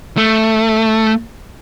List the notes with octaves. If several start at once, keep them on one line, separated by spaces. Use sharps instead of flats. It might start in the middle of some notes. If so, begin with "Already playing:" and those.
A3